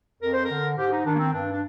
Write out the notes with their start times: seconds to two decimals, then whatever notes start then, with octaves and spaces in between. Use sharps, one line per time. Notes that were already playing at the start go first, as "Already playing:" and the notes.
0.22 F2 A#4
0.33 C5
0.45 A#4
0.51 D3
0.78 G#2 G4
0.91 D#4
1.06 D#3 D4
1.15 A#3
1.19 C4
1.33 G2 D4
1.52 D4